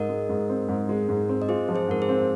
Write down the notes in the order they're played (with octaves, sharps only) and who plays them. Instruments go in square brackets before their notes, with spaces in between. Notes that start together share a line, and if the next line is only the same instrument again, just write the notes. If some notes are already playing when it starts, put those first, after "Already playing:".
Already playing: [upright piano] G#2 [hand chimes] A#4 D#5
[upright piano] G#3
G#2
C4
G#2
G#3
G#2
C4
[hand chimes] D#5
[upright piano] F4 [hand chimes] G#4 C5
[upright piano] F3
[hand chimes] G#4 C5
[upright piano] G#2 [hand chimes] A#4
[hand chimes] G#4 C5
[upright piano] C4